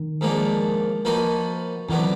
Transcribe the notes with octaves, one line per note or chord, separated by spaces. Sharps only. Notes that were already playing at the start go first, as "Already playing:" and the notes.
Already playing: D#3
G#2 F3 A#3 D4
F3 A#3 D#4 F#4 B4
F2 D3 E3 F#3 B3 D4